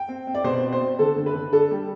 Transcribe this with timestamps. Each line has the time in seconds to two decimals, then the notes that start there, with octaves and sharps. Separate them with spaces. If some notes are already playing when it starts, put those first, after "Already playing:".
Already playing: G5
0.09 C4
0.27 C4
0.35 D5
0.44 B2 C5
0.63 C4
0.72 C5
0.81 C4
0.99 D3 A4
1.16 D3
1.26 B4
1.35 D3
1.53 D4 A4
1.71 G3